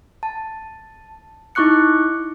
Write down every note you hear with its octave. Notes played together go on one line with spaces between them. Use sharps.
A5
D#4 E4 C#6 D6 F#6 C#7